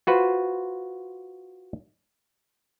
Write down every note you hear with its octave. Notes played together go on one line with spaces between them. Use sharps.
F4 F#4 B4 C5